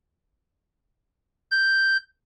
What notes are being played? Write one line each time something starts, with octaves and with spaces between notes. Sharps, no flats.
G6